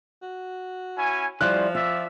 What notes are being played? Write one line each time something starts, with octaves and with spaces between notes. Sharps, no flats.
F#4
C#4 E4 G#5
F3 G3 C#4 E4 F4 C5 D5 F#6
C4 F4 D5 E5